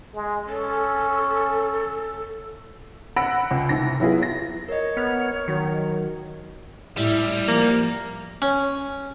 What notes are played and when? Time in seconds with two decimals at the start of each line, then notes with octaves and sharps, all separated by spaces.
0.14 G#3
0.49 C#4 A4
3.16 F#5 B5 E6 A#6 D7
3.51 C#2
3.69 C2 G#2 A#6
4.00 F#3 B3 E4 F4 G#4
4.23 A#6
4.68 A#4 C#5 D#5
4.97 B3 F6
5.48 D#3 F#3
6.97 A2 G3 E4
7.48 F3 A#3
8.42 C#4